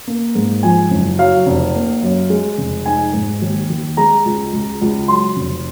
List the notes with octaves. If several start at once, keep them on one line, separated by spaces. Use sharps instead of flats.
A#3
G#2
F3 G#5
F#1
F#3 F5
F1
A#3
F#2
G#3
F1
D#4 G#5
G#2
D#2
D#2
G#3 A#5
C#2
C#2
C#2
F#3 C6
F1